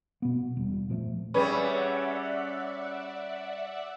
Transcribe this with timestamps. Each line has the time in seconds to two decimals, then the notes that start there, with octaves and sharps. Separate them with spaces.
0.22 B2 B3
0.57 E1 G3
0.89 A#2 F3 A3
1.34 G3 C#4 G#4 B4 D5 E5 F#5